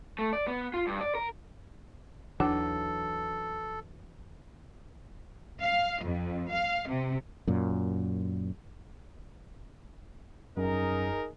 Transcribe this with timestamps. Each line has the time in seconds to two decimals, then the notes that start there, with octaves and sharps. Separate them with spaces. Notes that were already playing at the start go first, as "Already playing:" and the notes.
0.19 A3
0.33 D5
0.48 B3
0.74 F4
0.87 G2
1.01 D5
1.15 A#4
2.40 D#2 E3 F#3 D4 A4
5.60 F5
6.02 F2
6.50 F5
6.88 C3
7.47 F#2 A#2
10.57 F#2 D#4 G#4 A#4